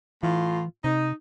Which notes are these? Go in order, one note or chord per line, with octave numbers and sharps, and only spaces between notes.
A2 E3 F4
C3 D#4